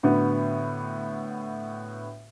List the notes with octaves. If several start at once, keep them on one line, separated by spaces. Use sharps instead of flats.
A2 D3 B3 F#4